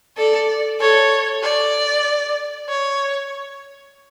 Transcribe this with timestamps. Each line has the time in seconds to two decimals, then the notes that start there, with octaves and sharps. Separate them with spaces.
0.17 A4 D5
0.80 A4 C#5
1.43 D5
2.69 C#5